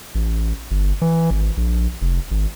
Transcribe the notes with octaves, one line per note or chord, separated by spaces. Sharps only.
A1
G1
E3
G#1
A#1
F1
G#1